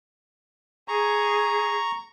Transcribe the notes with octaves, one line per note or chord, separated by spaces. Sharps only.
G#4 A#5 C#6